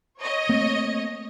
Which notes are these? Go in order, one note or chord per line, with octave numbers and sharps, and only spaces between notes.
C#5 D#5
A3 A#3 C4